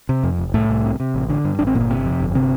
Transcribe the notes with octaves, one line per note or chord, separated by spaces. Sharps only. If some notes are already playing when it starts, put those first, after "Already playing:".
C3
F2
F1
C2 A2 A3
C2
C3
C3
A1
D3
G2
A1 D4
C4
G1 A#2 A#3
C3
F2
G1
C3 C4